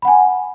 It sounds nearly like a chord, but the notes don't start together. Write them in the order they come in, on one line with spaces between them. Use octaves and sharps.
B5 F#5 G#5